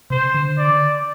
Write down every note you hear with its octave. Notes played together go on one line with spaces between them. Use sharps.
C3 C5
D3
D5